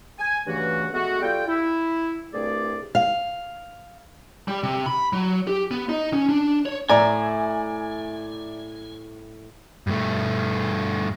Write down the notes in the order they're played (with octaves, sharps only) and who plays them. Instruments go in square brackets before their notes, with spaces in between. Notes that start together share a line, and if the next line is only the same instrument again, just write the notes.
[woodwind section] G#5
G2 C#3 E3 A3 F#4
G#3 A3 B3 F#4
G3 F4 A4 G5
E4
C2 G2 A3 G#4 D5
[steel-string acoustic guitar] F5
[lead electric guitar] G3
C3
B5
F#3
G4
B3
D#4
C#4
D4
C#5
[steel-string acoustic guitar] A2 E5 [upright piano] D5 A#5 [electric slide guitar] G#5
[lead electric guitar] G2 A3